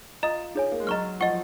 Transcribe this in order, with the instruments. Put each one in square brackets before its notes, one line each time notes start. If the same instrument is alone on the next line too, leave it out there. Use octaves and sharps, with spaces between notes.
[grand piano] F4 [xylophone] D#5 A#5 D#6
[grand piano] D#4 [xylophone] G#4 C#5 G#5
[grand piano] A#3
G#3
[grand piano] F#3 [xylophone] D#5 A#5 C#6 F6
[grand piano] F3 [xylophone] D#5 F#5 C#6